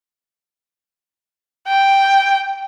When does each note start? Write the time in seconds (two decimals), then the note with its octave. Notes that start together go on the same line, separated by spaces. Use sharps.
1.68 G5